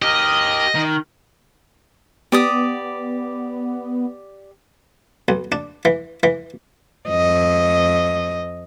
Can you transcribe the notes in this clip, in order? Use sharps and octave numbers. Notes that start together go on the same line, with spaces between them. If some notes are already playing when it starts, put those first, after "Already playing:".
G4 A#4 D#5
D#3
B3 G4 D5 D#6
B1
D4
E3
E3
F2 D#5